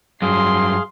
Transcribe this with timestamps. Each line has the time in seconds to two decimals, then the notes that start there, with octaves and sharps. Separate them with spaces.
0.22 G2 F#3 G#4 F5 C6